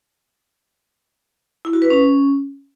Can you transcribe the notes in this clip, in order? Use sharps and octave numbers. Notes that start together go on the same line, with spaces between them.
E4
F#4
B4
C#4